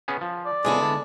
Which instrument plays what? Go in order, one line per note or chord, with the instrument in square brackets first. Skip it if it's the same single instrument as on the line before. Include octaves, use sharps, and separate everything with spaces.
[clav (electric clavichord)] B3 C#4 G#4
F3
[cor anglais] D5
[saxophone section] F2 C#3 G#4 [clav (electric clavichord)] G#3 [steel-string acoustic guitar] A3 B3 E4
[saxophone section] D3